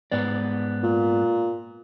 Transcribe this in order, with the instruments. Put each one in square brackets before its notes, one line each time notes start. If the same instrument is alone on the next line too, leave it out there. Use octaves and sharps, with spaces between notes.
[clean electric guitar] G#2 B3 D5
[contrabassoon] A#2